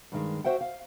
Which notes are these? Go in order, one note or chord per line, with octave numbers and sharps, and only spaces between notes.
G2 D#3 G#3
F#4 C5 E5 F#5 G5
F5